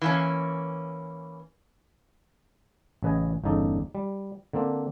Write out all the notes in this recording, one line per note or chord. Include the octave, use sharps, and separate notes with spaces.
E3 A#3 C#4
A1 C#3 B4 D#5 G#5
G1 E2 C#3 D#4 A4 D5
G3
D3 A#3 C4 D4